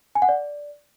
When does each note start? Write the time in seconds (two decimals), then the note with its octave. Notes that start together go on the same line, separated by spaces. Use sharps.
0.15 G#5
0.22 F#5
0.29 D5